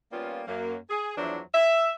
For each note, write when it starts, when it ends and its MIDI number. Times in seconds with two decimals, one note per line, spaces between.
0.12 0.41 55
0.12 0.41 58
0.12 0.41 59
0.12 0.41 61
0.12 0.41 65
0.47 0.76 42
0.47 0.76 58
0.90 1.15 68
1.17 1.40 40
1.17 1.40 53
1.17 1.40 54
1.17 1.40 62
1.17 1.40 64
1.17 1.40 72
1.54 1.94 76